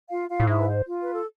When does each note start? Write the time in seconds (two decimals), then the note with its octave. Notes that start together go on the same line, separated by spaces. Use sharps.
0.09 F4 F5
0.29 F4 F5
0.40 A2
0.47 G#2 E4 E5
0.58 B4
0.68 C5
0.86 F4
1.02 B4
1.13 A4